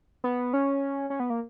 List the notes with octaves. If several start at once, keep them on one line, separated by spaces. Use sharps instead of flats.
B3
C#4
C#4
B3
A#3